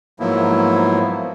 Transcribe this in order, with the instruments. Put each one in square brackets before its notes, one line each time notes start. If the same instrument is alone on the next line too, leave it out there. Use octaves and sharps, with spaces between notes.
[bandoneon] G#2 F3 F#3 A#3 B3 E4